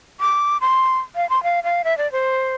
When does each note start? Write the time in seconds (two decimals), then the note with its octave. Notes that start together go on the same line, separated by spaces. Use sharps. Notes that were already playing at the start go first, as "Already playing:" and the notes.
0.20 D6
0.61 C6
1.16 F5
1.30 C6
1.43 F5
1.64 F5
1.84 E5
1.98 D5
2.12 C5